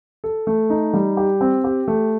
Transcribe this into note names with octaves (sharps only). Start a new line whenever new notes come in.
A4
A3
D#4
G3
G4
C4
G4
A3